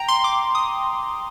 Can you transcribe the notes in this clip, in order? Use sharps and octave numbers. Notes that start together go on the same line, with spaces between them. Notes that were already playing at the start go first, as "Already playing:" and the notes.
Already playing: G5 A#5
C6
D6
D#6